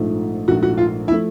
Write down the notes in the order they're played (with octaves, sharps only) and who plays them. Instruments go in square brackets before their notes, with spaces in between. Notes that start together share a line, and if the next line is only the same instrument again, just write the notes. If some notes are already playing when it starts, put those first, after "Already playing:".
Already playing: [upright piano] A#1 G#2 F3 A3
[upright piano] A#1 G#2 F3 A3 [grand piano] F#4
[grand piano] F#4
F4
E4
[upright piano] F3 A3